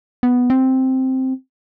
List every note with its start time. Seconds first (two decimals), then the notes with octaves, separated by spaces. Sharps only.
0.23 B3
0.50 C4